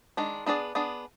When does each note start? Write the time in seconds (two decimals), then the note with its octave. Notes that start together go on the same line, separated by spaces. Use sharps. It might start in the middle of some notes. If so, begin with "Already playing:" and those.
0.17 D#3 G#3 D4
0.46 B3 D4 G#4 D5
0.75 B3 D4 G#4 D5